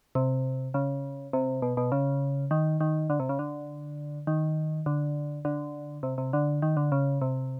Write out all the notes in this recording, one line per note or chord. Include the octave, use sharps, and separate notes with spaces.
C3
C#3
C3
B2
B2
C#3
D#3
D#3
D3
C3
C#3
D3
D#3
D3
D3
C3
C3
D3
D#3
D3
C#3
C3